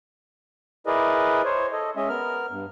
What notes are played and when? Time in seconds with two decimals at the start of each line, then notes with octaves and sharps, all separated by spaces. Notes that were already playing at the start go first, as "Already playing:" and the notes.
0.87 E4 G#4 A#4 B4 D5 D#5
1.45 C5 C#5
1.72 A4 D#5
1.96 G#3 C#4 D#5 E5
2.09 B3 A#4 F6
2.50 G2